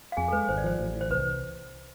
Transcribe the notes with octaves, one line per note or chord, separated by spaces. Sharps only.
F5
F2 G#4 G#5
A4
G#3 B4
G#1 C5
D5
F3 C5
A1
E3
C5
C2 B4